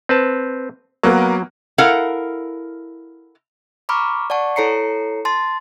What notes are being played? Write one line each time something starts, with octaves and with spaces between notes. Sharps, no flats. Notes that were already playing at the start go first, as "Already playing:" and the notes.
C4 B4 A5
F#3 A#3 B3 A#4
E4 A4 A#4 F5 F#5
A#5 B5 C#6 D6 F6
D5 F#5 A5 C#6
E4 A4 C#5 A#5 C7 C#7
A5 C6 A6